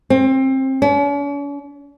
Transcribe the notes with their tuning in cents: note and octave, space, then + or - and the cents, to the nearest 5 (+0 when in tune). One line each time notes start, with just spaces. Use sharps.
C4 +25
C#4 +45